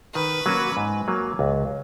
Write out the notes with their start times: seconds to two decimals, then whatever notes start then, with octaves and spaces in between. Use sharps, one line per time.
0.14 D#3 B4
0.46 F#3 A#3 C#4 F#4
0.77 G#2
1.08 F#3 A#3
1.39 C#2